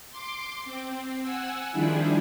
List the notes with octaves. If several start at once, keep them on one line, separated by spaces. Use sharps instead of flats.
C6 D6
C4
F#5 G#5 E6
D#3 F3 G3 D4 E4 G#4